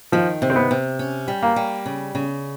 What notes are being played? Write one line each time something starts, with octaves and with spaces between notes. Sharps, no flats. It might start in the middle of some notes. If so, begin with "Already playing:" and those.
D#3 F3
C3
C4
B3
C3
C#4
G3
A#3
G3
C#3
C#3